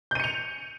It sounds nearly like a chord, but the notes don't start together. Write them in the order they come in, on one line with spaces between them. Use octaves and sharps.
G6 D#7 C#7 F7